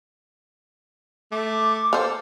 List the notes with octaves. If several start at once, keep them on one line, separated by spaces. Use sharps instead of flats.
A3 D6
A4 C5 F5